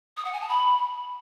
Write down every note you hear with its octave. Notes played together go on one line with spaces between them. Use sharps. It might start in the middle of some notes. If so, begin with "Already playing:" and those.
D#6
F#5
G#5
A5
B5